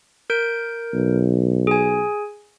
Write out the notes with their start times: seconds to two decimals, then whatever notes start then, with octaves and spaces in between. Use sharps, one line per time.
0.30 A#4 G6 D7
0.94 B1
1.67 G#4 G#5